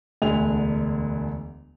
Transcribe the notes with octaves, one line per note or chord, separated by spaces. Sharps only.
E1 D2 D3 D4 G#5 F7